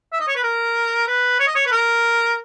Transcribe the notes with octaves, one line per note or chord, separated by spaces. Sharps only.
E5
D#5
C#5
B4
A#4
B4
C#5
D#5
C#5
B4
A#4